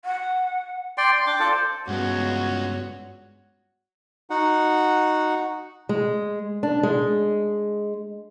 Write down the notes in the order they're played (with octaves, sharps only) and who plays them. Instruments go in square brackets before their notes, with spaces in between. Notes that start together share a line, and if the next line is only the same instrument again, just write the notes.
[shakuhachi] F#5
[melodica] D5 G5 C6
C6
D4 G5 D6
F4 A4 D5
C5
[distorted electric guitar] C#2 [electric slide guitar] G2 G#3 B3 [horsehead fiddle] F#4 C#5
[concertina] D#4 F#4 F#5
[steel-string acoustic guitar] G#3
D4
G#3